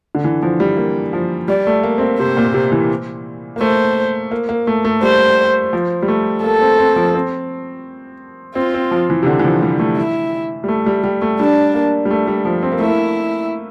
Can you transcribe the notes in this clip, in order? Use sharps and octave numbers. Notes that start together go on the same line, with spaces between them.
D3
E3
F3
G3
A#3
F3
G3 D5
A3
A#3
C4
A#3
C3 C5
A#2
A#2
C3
E3
A#3
A3 C5
A#3
A#3
A3
A3
G3 C5
F3
G3
A3
A#3 A4
C4
C4
F3
C4
C4 F4
C4
F3
E3
C3
D3
E3
F3
G3
A3
E4
G3
A3
G3
G3
A3
G3 D4
A#3
G3
A3
G3
F3
C4
A#3
A3 E4
A#3